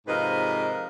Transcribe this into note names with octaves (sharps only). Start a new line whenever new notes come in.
G#2 C3 F3 A#4 B4 D#5